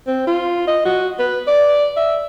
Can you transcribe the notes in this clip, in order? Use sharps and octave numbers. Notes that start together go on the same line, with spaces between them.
C4
F4
D#5
F#4
B4
D5
E5